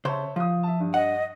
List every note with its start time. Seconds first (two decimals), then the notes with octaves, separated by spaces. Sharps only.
0.05 C#3 C5 C#5 E5 A5
0.36 F3 F4 D#6
0.63 E5 A5
0.80 G2
0.94 D#5 F#5